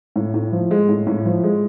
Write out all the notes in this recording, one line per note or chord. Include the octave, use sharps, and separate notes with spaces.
A2
A2
F3
G#3
A2
A2
F3
G#3